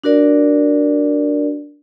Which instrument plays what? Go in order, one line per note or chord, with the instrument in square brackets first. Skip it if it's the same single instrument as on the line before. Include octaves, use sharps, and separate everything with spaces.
[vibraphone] D4 F#4 A#4 D5